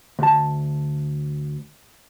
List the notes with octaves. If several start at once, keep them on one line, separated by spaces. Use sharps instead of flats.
D2 A5